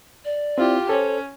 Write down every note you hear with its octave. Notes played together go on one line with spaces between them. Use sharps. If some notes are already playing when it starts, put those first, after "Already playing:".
D5
C4 E4 F4 G4
C#4 A4 C5 C#5